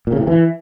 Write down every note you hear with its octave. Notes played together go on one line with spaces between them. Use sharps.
A#2
C#3
A2
C3
E3